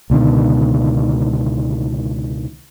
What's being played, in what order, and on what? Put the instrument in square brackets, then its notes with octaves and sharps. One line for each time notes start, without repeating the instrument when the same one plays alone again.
[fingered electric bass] C#2 B2 D3 D#3